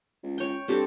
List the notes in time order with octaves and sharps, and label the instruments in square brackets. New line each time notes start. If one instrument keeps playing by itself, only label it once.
[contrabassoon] C#2
[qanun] C#5 G5
[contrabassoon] G2 [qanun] C4 G4 A4